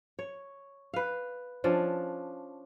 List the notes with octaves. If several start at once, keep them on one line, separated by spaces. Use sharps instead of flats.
C#5
B4 F5
F3 C#4 D4